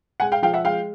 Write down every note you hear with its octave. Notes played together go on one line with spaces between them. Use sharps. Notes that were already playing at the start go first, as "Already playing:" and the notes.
G#3 F#5 G#5
F5 G5
F3 F5 G5
E5 F#5
G#3 F5 G5